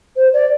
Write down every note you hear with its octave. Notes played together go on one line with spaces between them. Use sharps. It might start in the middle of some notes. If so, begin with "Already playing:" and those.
C5
D5